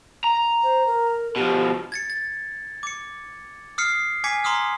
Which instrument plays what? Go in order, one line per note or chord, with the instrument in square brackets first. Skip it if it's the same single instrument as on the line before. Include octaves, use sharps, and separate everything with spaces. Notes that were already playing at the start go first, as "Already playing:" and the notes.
[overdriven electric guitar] A#5
[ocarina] C5
A#4
[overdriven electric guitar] B2 F3 [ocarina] G4
[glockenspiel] G#6 A6 C#7
A6
D6 C#7
D#6 F6 C7 C#7
G#5 D6 G#6 B6 C#7
A#5 C6 D6 D#6 F6